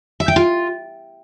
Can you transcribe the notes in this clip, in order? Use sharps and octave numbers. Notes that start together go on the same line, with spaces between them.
E5
G5
F4